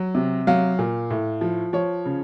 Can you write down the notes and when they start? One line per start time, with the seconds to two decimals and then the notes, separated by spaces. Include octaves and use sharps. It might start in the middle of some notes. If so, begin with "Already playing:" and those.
Already playing: F#3
0.15 C3
0.47 F#3 F5
0.79 A#2
1.10 A2
1.41 F3
1.73 F3 C#5
2.06 C#3